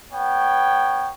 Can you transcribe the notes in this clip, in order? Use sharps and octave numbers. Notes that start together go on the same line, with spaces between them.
B3 C#5 G5